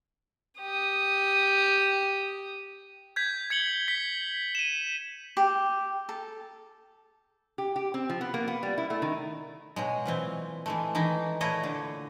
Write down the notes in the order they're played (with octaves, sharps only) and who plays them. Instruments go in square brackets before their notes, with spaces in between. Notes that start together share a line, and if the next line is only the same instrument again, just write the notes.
[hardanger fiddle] G4 D#6
[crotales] G6 G#6 B6
G#6 C#7 F#7 G7
B6
D#7 E7
[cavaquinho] G4
A4
[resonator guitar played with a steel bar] G4
G4
C4
F3
B3
A#3
B3
G3
E4
A3
D#3
[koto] B2 F#3 G#3
A#2 E3 C4
E3 G#3 A3
D#3 E3 D#4
A#2 A3 E4 C#5 D#5
D3